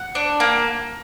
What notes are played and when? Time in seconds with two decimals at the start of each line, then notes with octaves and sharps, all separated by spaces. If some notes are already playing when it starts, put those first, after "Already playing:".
Already playing: F#5
0.15 D4
0.40 A#3